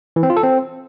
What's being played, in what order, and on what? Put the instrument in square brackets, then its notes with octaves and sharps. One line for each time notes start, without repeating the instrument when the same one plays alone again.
[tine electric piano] E3
C4
F4
A4
C4